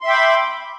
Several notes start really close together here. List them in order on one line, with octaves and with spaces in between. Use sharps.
C6 E5 G5 D6 B5